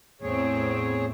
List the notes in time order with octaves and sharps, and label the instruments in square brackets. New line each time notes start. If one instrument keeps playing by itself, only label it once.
[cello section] E2 A2 C4 [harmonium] G#4 C#5